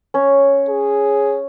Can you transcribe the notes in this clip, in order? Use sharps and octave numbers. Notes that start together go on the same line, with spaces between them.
C#4 C#5
G#4